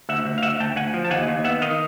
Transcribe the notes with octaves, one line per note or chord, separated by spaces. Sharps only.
D2 E5 F#5
D2
F5
D2 E5 F#5
D2 G5 A5
D2 F#5 G#5
F3
A5
D#2 F#5 G#5
D#2
B3 E5 F#5
D#3 D#5 F5